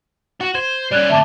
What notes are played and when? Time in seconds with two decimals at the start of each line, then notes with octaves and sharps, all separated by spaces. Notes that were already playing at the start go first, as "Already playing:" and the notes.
0.41 F#4
0.55 C5 G#6
0.91 G3 C#4 D5 F#6 G#6
1.09 D2 A2 E5 A5 D6